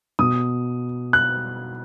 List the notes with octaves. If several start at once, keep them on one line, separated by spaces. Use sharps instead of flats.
B2 D#6
F#6